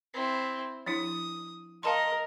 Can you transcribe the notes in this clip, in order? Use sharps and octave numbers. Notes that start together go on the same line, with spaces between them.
C4 E4
F3 D4 E4 D#6
A#4 D#5 F5 A5 C6